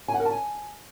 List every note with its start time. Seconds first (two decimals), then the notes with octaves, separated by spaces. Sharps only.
0.08 G#5
0.14 F#5
0.20 A#4
0.25 A5
0.31 G#5